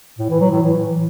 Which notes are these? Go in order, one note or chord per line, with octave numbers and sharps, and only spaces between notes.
A2
E3
F#3
A2
E3